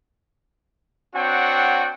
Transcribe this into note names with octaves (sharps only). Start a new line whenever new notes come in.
C4 D4 F#4 C#5 F#5 G5